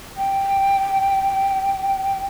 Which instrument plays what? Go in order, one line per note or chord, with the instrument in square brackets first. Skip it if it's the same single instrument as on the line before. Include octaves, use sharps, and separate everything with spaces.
[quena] G5